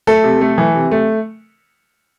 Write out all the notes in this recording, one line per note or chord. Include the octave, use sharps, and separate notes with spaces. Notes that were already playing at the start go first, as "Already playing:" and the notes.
A3 A4
C3
A3
E3
C3
A3